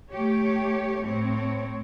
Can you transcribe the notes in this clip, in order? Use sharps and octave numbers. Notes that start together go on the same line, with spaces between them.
A3 G4 C#5
A2 C4 C#5